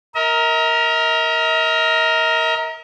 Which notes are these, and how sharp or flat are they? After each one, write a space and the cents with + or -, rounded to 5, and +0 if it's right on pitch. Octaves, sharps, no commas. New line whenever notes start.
A#4 +0 D#5 +45